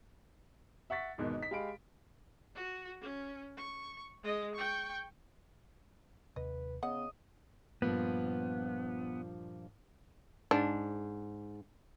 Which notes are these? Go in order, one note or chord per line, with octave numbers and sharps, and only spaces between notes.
E5 F#5 C#6 A6 B6
G#1 E2 G#2 B2 D#3
D#4 B6
G#3 G4 F5 B5 D7
F#4
C#4
C#6
G#3 D#5
G5 C#6
D#2 C3 B4 D#5
C#3 B3 D#5 F#5
G2 A#2 F3 B3
G#2 D4